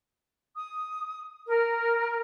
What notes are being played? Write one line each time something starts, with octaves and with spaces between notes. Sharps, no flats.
D#6
A#4